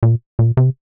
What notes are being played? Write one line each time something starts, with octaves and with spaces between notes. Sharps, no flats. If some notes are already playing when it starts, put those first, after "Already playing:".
A#2
A#2
C3